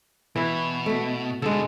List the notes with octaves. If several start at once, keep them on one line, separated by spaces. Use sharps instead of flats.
B2 E3 E4
A3 F#4
B2 D3 G#3 A4